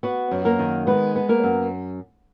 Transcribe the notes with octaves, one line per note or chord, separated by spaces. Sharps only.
B3 F#4
F#2
A#3 A#4
D#3
G#3 B3 B4
B3
A#3 A#4
F#2